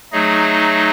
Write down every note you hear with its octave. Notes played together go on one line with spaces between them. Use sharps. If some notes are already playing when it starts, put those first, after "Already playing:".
F#3 A3 D#4 G#4 D#5